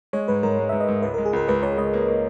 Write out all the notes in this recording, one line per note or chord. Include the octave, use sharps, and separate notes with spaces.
G#3 C#5
G#2 B4
G#2 A#4
G#3
G#2 E5
D#5
G#2
C#2 B4
G#3 A#4
G#4
C#2 A#4
C#2 B4
C#2 C#5
C#2 D#5
A#3
A#3